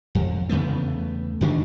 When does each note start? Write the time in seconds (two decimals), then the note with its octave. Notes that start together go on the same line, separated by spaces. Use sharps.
0.15 F2
0.49 E2 C#3 A3 B3
1.41 E2 D#3 D4